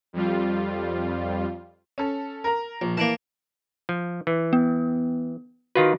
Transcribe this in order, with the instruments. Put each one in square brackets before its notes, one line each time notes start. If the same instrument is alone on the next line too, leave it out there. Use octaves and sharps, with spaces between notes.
[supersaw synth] F2 G3 F4
[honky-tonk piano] C#4 A4
A#4 A#5
[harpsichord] A#1
[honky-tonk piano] E3 [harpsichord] A#3 D5 A5
[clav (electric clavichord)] F3
E3
[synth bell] B3
[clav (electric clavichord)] D#3 F4 B4 [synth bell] F#4